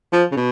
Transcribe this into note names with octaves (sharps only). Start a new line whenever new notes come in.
F3
C#3
B2